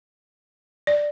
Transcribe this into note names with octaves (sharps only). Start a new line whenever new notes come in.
D5